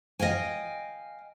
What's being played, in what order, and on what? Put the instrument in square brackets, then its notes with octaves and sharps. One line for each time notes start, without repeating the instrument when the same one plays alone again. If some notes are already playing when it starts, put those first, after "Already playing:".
[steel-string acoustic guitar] D#5 F5 G5 G#5